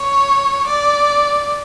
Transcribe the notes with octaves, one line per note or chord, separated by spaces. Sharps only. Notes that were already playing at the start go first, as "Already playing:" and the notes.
Already playing: C#5
D5